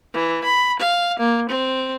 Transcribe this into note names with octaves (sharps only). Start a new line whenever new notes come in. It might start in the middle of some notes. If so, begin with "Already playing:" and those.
E3
B5
F5
A#3
C4